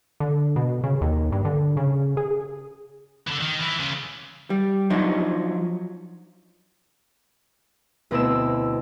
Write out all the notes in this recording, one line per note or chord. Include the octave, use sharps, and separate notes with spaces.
D3
B2
C#3
D#2
G2
D3
C#3
G#4
D3 E3
D#3
E3
C#3 F4
G3
F3 F#3 D4 D#4
D2 B2 B3 C4 E4 E6